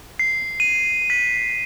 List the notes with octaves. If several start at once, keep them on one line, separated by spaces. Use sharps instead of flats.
C7
D#7
B6